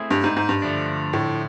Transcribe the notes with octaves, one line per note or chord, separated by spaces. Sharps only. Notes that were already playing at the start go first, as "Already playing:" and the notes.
Already playing: A3 C4 E4 G#4
G2
G#2
G#2
G2
D3 F3 A3 D4
A2